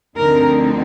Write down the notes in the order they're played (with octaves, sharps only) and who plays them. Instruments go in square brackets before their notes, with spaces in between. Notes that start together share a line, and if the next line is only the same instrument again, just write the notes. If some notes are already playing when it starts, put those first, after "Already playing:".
[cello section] D2 D3 F3 C4 D#4 A#4